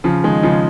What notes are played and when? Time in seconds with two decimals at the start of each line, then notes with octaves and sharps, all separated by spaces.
0.04 C#3 F3
0.24 D#3 G#3
0.43 C#3 F3